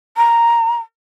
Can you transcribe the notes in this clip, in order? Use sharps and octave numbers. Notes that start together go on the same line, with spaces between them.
A#5